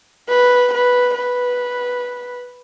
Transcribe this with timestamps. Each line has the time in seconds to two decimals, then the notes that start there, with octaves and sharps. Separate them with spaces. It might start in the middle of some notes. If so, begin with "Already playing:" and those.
0.29 B4
0.74 B4
1.16 B4